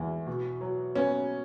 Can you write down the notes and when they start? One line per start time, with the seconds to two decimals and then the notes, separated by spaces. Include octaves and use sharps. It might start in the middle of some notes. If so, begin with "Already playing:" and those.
Already playing: E2 G#3 E4
0.27 B2
0.61 F#3
0.96 B3 C#4